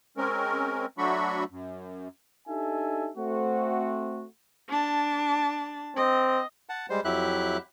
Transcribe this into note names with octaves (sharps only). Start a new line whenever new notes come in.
G#3 C4 C#4 A#4
F#3 A3 D4 F#4 B5 C#6
F#2
D4 D#4 G4 A4 E5 G#5
A3 C4 F#4
D4 A5
C4 D#5
F#5 A5
G3 G#3 C5
F2 F#3 E4 G4 E5 F#6